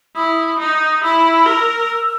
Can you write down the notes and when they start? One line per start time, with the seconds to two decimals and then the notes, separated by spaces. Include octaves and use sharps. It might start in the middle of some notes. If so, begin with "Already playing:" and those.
0.16 E4 D#6
0.59 D#4
1.02 E4 E6
1.46 A#4